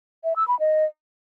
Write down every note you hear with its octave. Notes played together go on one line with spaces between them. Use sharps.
E5
E6
B5
D#5